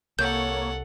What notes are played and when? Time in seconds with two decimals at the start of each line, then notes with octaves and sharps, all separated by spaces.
0.19 C2 A#3 A4 C#5 F#5 G6